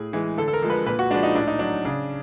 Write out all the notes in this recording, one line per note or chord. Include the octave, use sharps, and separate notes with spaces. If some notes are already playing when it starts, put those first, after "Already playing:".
Already playing: A2 G#4
E3 G#3
D3 A4
A4
A#4
F3 G#3
B4
A#2 B4
F#4
F3 G#3 D4
D#4
A2 D4
D#4
F#3 D4
C#3 D4